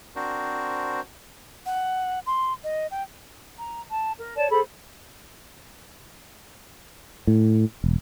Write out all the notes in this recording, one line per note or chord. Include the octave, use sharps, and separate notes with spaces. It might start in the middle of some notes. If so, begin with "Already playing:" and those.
C4 D4 F#4 A#4 C5
F#5
C6
D#5
G5
A#5
A5
A#4
C#5 D5 A5
G#4 A4 C5 B5
A2
E1